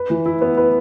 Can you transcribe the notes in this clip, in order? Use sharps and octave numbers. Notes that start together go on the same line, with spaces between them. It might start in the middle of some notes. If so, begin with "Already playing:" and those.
Already playing: B4
E3
E4
B3
B4